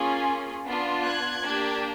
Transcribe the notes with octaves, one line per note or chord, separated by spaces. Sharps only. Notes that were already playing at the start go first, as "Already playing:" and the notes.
Already playing: A#3 C#4 F4 G#4
B3 D4 F4
F#6 G#6
A#3 D4 G4